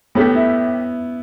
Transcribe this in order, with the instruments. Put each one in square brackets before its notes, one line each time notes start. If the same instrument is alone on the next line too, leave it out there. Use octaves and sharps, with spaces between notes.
[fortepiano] A2 A3 G4 [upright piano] B3
[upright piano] E4